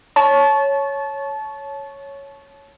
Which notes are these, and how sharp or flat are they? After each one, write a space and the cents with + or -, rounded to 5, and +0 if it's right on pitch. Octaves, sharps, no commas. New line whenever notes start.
C#5 +0 A5 -25